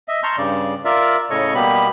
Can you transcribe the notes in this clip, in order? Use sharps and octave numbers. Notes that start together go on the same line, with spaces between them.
D#5 E5
A5 A#5 C6 C#6 F6 G6
G2 C#3 D5
F4 A#4 D5 E5
A2 C#3 A4 C#5 D#5 C#6
B2 G3 A#3 B3 G4 B5